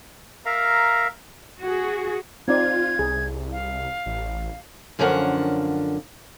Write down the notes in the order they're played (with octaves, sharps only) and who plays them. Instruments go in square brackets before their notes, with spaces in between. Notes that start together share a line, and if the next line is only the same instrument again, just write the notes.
[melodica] A#4 E5 F5 A#5
[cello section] F#4 G#4
[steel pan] C4 D#4 D5 [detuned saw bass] F4 [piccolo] G#6
[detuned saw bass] C2 [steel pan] G#4
[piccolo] F5
[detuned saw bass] A1
[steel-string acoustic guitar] F#2 D3 F3 C#4 A#4 F#5